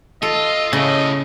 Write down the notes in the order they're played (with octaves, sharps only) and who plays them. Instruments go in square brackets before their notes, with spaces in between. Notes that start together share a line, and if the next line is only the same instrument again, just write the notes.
[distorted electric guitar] F4 [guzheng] A4 [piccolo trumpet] D#5 [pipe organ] E6
[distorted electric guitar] A2 [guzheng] C#3 [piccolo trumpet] D#5